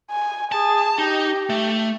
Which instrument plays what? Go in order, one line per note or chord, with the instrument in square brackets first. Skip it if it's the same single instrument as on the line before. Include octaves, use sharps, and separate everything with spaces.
[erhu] G#5
[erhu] G#4 [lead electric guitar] A5
[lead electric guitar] D#4 [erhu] G4
[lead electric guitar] A3